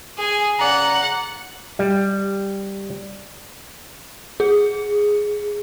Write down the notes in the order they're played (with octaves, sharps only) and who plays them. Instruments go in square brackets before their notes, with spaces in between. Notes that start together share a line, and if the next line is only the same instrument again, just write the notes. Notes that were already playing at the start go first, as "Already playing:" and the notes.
[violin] G#4 G#5
[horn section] C#3 D5 A#5 [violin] F#5
[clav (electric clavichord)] G3
[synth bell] G#4